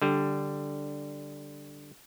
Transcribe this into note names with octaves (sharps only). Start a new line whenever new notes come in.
D3 G3